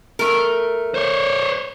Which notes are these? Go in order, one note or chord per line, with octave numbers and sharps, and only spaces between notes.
A3 A#4
C5 C#5